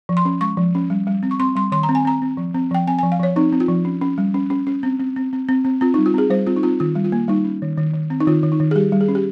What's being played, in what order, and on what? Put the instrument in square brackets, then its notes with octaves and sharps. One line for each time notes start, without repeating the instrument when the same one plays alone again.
[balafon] F3
C6
C#4
G#3 C#6
F3
C#4
G3
G3
C4
C#6
C4 C6
G3 C6
D#3 C6
A#5
C4
G#5
C4 A#5
C4
F3
C4
F3 G5
C4 G#5
G#5
F3
F5
F3 C#5
C4 D#4
C4
F4
F3
C#4
C#4
G3
C#4
C#4
C#4
C4
C4
C4
C4
C4
C4
C4 F4
D#4
G3
F4
C4 G#4
G3 C5
C4 F4
D#4
C4 F4
D#3 F4
G3
F4
A#3
G3 D#4
C#4
D#3
D#3
D#3
C4
D#4
D#3 F4
D#3
D#4
D#3
G#4
G3 G4
G3
G#4
C#4
G4